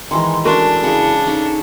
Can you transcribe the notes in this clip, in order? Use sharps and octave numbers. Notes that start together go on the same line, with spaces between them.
D#3 E3 G#3 C6
G#3 A3 C#4 D4 F#4 A#4
C#3 E4 G#4
C#4 D#4 A4